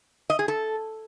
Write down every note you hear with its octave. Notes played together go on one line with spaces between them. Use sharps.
D#5
G#4
A4